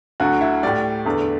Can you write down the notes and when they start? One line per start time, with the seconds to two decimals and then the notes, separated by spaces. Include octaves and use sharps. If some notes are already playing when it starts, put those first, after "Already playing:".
0.20 D2 D3 F#3 F#4
0.41 E4
0.63 A2 G3 D5
1.05 E2 D3 A3